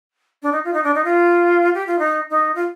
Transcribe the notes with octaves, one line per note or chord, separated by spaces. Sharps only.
D4
D#4
F4
D#4
D4
D#4
F4
G4
F4
D#4
D#4
F4